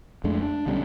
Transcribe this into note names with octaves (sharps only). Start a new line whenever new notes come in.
F2 G#3 A3 D4
D4
B1 D3 G3 C#4